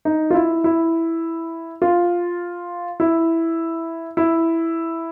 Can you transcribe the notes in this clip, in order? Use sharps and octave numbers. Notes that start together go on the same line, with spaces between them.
D#4
F4
E4
E4
F4
E4
E4